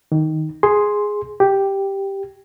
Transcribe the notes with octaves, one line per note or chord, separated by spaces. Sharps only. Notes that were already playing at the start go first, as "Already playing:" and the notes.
D#3
G#4 C6
G4